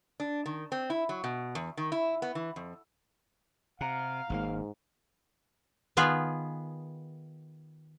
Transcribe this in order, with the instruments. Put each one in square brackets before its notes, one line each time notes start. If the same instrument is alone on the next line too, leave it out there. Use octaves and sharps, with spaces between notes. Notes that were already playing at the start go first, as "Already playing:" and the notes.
[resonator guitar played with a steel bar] D4
D#3
C4
E4
F#3
B2
E2
D#3
E4
B3
E3
F2
[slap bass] C3 [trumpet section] F5 [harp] F#5 A#5
[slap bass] G#1 C3 A#3 [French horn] G#2
[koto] D#3 B3 F4 G#4 B4